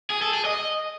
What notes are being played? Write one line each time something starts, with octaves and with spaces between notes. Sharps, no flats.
G#4
A4
G#4
D#5